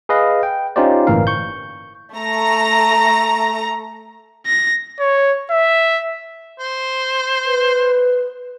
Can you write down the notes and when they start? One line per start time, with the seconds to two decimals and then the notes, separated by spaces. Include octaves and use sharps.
0.09 G#4 B4 D#5 F5
0.43 G5
0.76 C#4 D#4 F4 G4 C5 D5
1.07 G1 A2 E3 A#3 A#4 F5
1.27 C#6 G6
2.16 A3 A#5 A#6
4.46 A#6
5.00 C#5
5.51 E5
6.59 C5
7.46 B4